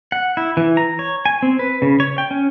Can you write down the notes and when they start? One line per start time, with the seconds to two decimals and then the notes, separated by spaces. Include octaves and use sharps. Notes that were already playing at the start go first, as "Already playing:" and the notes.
0.12 F#5
0.37 E4
0.57 E3
0.77 A#5
0.99 C#5
1.26 G#5
1.43 C4
1.59 B4
1.82 C#3
2.00 C#5
2.18 G5
2.31 C#4